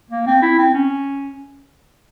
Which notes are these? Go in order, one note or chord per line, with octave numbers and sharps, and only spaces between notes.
A#3
C4
E4
C4
C#4